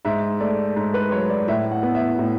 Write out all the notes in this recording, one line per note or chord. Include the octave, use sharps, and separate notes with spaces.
G#2 E5
A3 D5
G#2
B4
F#3 C#5
D5
A2 E5
F#5
B3
E5
A2